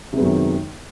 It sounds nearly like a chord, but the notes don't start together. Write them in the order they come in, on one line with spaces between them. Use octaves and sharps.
C3 G#3 B3 F#2 D#3